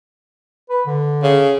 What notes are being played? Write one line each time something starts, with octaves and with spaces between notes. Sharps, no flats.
B4
D3
C#3